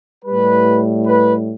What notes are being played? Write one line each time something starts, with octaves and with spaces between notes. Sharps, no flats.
G3 B4
A2
B4